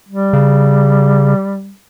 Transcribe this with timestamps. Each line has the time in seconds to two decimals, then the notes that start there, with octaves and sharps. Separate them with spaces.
0.09 G3
0.33 C#3